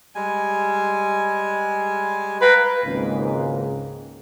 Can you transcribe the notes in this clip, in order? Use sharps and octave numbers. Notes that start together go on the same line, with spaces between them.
G3 G#3 G#5
B4 F5 G5 A#5
G#1 C#2 G#2 C#3 A#3 C4